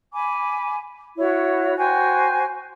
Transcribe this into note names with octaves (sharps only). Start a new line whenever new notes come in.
G#5 B5 D6
E4 F#4 C#5
F#4 C5 G5 G#5